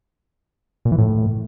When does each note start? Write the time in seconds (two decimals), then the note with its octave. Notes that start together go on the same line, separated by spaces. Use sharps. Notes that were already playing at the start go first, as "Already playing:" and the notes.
0.85 A#2
0.92 E3
0.98 A2